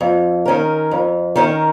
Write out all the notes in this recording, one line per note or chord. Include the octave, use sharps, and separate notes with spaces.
F2
D#3 C#4 A#4
F2
D#3 C#4 A#4